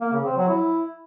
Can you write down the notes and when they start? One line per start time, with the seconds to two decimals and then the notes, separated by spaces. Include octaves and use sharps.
0.01 A#3
0.13 C#3
0.25 C4
0.37 F#3
0.48 E4